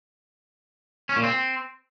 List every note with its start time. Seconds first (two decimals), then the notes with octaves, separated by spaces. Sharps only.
1.09 C#4
1.16 A#2
1.23 C4